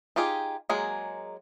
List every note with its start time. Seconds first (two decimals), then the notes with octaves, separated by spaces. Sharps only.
0.16 D#4 F4 G4 G#4
0.69 F#3 G#3 A#3 G#4